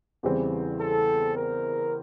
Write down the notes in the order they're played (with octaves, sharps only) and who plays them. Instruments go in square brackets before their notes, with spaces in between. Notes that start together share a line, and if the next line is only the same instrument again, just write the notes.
[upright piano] E2 C#3 E3 G3 C4
[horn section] A4
A#4